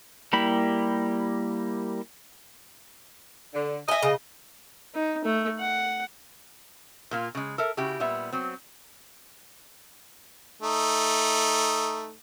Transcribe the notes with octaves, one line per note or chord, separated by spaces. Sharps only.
G3 A#3 E4 G4 B5
D3
D#5 E5 G#5
C#3
D#4
A3
F#5
A#2 A#3 F4
C#3 G#3
A4 A#4 E5
C#3 E4 F#4 G4
A#2 G3 B3 E5
F#3 C4
A3 D#4